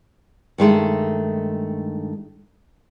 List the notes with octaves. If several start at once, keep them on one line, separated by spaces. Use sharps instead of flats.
G2 D#3 G#3 A3